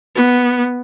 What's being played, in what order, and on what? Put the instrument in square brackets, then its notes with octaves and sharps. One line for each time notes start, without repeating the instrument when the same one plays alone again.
[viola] B3